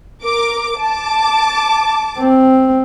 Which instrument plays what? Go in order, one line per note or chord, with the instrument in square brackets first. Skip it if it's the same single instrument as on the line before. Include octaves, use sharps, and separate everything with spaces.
[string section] A#4 D6
A5 D6
[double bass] C4